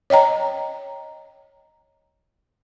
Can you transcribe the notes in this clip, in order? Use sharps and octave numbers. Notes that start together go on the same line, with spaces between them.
C#5 D#5 G5 A#5